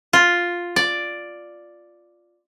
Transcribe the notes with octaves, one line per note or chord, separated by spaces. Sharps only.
F4
D5